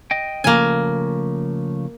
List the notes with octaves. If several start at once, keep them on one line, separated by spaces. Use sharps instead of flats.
D#5 G5
C#3 F3 A3 A#3 G#5